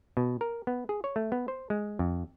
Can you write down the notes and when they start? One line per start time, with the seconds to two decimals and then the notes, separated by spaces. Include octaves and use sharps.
0.17 B2
0.41 A#4
0.67 B3
0.89 G#4
1.04 C#5
1.16 A3
1.32 B3
1.48 C5
1.70 G#3
1.99 F2